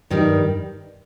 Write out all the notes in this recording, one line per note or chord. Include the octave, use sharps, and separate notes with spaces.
G2 D#3 G3